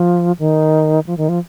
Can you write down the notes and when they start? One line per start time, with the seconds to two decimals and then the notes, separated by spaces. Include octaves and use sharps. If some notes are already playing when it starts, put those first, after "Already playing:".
Already playing: F3
0.39 D#3
1.07 F3
1.18 D#3
1.29 F3